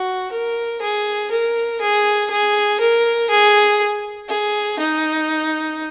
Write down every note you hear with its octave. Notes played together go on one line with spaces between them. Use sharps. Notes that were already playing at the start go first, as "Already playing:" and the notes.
Already playing: F#4
A#4
G#4
A#4
G#4
G#4
A#4
G#4
G#4
D#4